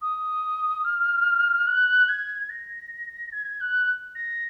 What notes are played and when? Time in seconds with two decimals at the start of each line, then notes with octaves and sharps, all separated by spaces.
0.02 D#6
0.84 F6
1.67 F#6
2.08 G#6
2.50 A#6
3.33 G#6
3.61 F#6
4.15 A#6